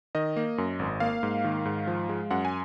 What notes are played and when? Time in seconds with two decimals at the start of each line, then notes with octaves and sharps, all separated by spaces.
0.15 D#3 D#5
0.36 A#3
0.58 F#2
0.79 G#1
1.00 A#3 F5
1.23 G#2
1.44 D#3
1.65 G#2
1.87 F3
2.09 G#3
2.31 F#2 F#5
2.45 G#5